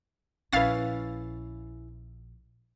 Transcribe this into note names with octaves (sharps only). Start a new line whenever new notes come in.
A#1 C#4 E4 B4 F5 A6